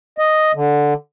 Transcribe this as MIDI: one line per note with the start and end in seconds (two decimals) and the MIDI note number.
0.18 0.52 75
0.55 0.94 50